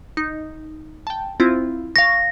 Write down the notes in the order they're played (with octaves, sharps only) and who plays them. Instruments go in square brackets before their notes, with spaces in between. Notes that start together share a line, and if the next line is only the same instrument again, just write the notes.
[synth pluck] D#4
G5 A5
C4 E4 F4
[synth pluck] F5 C#6 [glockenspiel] A#6